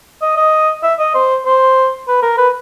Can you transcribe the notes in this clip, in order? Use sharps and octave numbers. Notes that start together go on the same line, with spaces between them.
D#5
D#5
E5
D#5
C5
C5
B4
A#4
B4